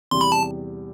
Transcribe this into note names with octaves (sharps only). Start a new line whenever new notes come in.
E2 C3 G3 C6
B5
A5